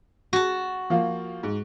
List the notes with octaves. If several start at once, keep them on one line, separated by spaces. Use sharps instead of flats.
F#4 A5
F3 A#3 F4
G#2